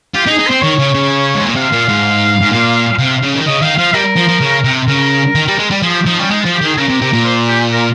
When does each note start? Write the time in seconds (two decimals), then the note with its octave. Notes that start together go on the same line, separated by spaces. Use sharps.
0.15 F4 G4
0.27 D#4
0.30 G#4
0.39 D#4
0.47 C4 C5
0.62 D#3 C#5
0.78 C#3
0.94 C#3
1.35 G#2
1.45 A#2
1.56 C3 F5
1.73 A#2
1.88 G#2
2.42 G#2
2.52 A#2
2.99 C3
3.22 C#3
3.35 D#3
3.46 C#3 D#5
3.62 D#3 F5
3.78 F3 F5
3.94 G3 A#4
4.16 F3
4.29 F3
4.41 C#3
4.64 C3
4.87 C#3 A#4
5.35 D#3
5.48 G3
5.59 G#3
5.71 G3
5.82 F3 G#4
5.94 G4
6.06 F3 D#4
6.18 G3 C#4
6.30 G#3 D#4
6.42 F3 F4
6.54 G4
6.62 D#3 G#4
6.77 C#3 A#4
6.89 C3
7.02 C3
7.13 A#2
7.25 C5
7.48 G4
7.72 A#4